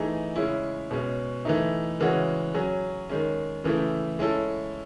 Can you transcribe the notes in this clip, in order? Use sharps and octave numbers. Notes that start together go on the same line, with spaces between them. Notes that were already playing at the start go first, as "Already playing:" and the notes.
Already playing: E3 A3 D#4 G#4
C#3 G#3 C#4 E4
B2 G#3 C#4
E3 A3 D#4
C#3 E3 G#3 C#4 F#4
F#3 C#4 G#4
D#3 G#3 C#4
C#3 E3 A3 E4
G#3 C#4 E4 A4